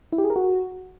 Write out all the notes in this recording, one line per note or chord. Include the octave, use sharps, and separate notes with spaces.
E4
G4
G#4
A#4
F#4